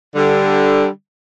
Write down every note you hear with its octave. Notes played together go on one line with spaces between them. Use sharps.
D3 G3